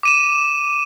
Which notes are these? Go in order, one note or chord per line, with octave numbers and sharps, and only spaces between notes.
D6 D#7 E7